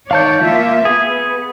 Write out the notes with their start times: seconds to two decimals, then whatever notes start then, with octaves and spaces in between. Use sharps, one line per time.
0.11 D#3 C#5 D5 F5 A5 G6
0.42 A#3 F4 E5
0.85 B3 G#4